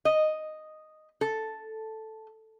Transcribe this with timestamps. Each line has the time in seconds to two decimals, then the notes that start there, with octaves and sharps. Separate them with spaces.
0.05 D#5
1.21 A4